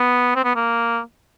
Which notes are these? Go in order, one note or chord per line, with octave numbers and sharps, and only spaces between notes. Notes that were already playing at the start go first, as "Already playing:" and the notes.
Already playing: B3
C4
B3
A#3